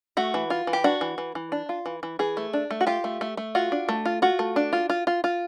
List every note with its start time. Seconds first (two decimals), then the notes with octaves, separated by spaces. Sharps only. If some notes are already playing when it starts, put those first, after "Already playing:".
0.17 A3 F#4
0.34 E3
0.50 F4
0.67 E3
0.73 G4
0.84 D4 F#4
1.01 E3
1.18 E3
1.35 E3
1.52 D4
1.69 F4
1.86 E3
2.03 E3
2.19 E3 G#4
2.37 A3
2.53 D4
2.70 A3
2.81 F#4
2.87 F4 G4
3.04 A3
3.21 A3
3.37 A3
3.55 F4 F#4
3.72 D4
3.89 A3
4.05 F4
4.22 F4 F#4
4.39 A3
4.56 D4
4.73 F4
4.89 F4
5.07 F4
5.24 F4